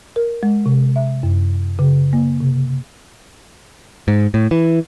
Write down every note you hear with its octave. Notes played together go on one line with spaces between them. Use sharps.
A#4
G#3
C3
E5
F#2
C#3
A#3
C3
G#2
A2
E3